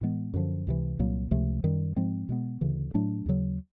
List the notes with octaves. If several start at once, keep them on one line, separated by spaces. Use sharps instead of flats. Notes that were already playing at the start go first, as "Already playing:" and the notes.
A2 E3 G#3 B3
F#2 D3 F3
C#2 C3 E3
C2 A#2 F#3 A#3
C#2 C3 F3 A3
F#2 D#3 G3
G#2 F3 G#3 C4
B2 G#3 B3
D2 C#3 E3
A2 F#3 A3 D4
D#2 C#3 F#3